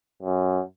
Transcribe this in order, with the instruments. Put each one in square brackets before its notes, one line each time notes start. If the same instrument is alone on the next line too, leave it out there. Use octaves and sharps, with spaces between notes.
[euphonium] F#2